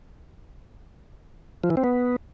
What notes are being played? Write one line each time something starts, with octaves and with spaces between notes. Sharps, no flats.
F3
E3
C4
B3